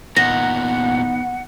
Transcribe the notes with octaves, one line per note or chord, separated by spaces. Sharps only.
E2 A#2 B3 D#4 F#5 A#6